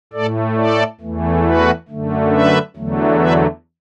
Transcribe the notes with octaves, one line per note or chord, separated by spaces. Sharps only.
A2 A3 A4 D5
A4 D5
E2 E3 A3
F#4 B4
F#2 D3 A3
B4 E5
E2 D3 F#3 A3
B4 E5